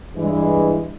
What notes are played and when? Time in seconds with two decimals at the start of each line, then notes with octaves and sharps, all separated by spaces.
0.15 G2 E3 G#3